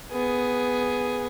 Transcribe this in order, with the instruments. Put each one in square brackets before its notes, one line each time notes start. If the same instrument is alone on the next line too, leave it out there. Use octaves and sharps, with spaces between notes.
[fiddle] B3 G#4